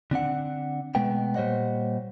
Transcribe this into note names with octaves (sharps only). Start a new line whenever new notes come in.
D3 C4 D4 F#5
B2 G#3 A3 B3 G5
A#2 G3 C5 C#5 D#5 F#5